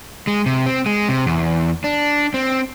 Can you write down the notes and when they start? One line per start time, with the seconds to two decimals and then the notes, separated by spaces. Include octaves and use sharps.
0.27 G#3
0.46 C3
0.66 C4
0.86 G#3
1.09 C3
1.26 E2
1.84 D4
2.34 C4